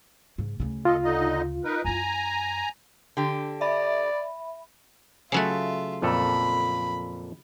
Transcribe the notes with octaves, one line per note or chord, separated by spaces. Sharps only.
G#2 C#3
D2 C#3
F4 A4 D#5
D3 D#4 D#5
D#4 A#4 B4
F#2 E4 G#5 A#5
D3 G4
D5 E5 B5
C#3 F#3 A3 F4 E5
F2 A#2 A4 B5